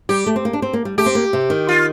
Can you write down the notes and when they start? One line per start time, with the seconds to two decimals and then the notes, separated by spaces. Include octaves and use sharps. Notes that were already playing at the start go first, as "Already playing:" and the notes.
0.09 G3 G4
0.26 A3
0.36 C4
0.45 A#3
0.53 D4
0.62 C4
0.73 A#3
0.85 G3
0.98 A3 G4
1.06 C4
1.15 A#3
1.33 C3
1.50 D#3
1.69 F4